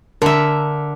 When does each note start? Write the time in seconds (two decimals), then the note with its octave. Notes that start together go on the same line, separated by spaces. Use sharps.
0.22 D3 A#4 E5